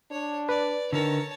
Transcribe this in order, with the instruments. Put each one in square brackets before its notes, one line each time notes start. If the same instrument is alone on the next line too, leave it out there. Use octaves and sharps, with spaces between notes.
[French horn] D4 [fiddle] C#5
[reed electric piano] B4 [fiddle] D5
[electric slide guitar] D3 A#4 [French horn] D#3 [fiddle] C#5 A5